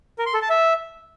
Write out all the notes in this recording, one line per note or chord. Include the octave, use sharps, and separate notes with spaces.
A#4
C6
A4
A5
E5